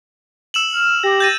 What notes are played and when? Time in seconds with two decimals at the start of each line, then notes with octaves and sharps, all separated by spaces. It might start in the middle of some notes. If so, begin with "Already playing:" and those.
0.54 E6 E7 F#7
0.73 F6
1.03 G4 A#6
1.20 G6 A6 D#7